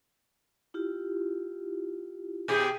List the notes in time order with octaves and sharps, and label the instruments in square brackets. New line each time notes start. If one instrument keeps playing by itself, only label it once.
[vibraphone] E4 F4 G4
[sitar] B2 G4 G#4